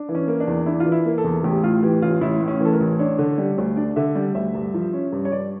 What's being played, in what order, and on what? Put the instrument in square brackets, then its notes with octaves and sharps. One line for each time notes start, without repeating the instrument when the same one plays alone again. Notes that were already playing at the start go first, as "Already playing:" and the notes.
Already playing: [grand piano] D4
E3
[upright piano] C#4
[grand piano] A#3
[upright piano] D4
[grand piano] E2
[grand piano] D4 [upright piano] E4
[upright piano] F4
[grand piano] E3
[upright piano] E4
[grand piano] A#3
[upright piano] A4
[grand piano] E2
[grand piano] A1 [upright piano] G4
[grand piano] A2 [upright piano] F4
[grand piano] E3 [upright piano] G4
[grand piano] A1 [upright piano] F4
[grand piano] A1 [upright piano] E4
[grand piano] A2
[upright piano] C#4
[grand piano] E3 [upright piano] A4
[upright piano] A#4
[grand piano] A1
[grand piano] D4 [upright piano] C#5
[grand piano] D3
G3
D2
[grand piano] D4 [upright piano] D5
[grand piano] D3 [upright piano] E5
[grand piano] G3 [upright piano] D5
[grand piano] D2 [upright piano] E5
[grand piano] G2
F3
C#4
G2
[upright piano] C#5
[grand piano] G2 [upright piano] D5